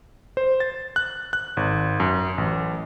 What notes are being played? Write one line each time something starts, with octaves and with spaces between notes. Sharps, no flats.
C5
A6
F#6
F#6
G#1
F#2
A1